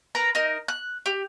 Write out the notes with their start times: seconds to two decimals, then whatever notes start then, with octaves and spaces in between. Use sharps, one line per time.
0.15 A#4 B4 A#5
0.35 D#4 A#4
0.68 F#6
1.06 G4